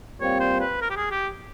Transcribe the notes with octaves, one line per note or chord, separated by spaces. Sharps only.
A#2 G3 C4 F4 C#5
C5
B4
A#4
G4
G#4
G4